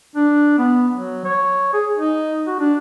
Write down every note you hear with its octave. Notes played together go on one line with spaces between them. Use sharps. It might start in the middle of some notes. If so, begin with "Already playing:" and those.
D4
B3
F#3
C#5
G#4
D#4
F#4
D4